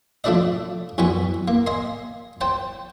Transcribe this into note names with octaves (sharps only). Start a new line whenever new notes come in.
F3 A3 D4 A4 D5 D#5
F#2 E3 G3 B3 C#6
A#3
D#5 G#5 C6
C5 G5 A5